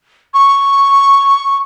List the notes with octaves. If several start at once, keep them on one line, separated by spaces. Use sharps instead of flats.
C#6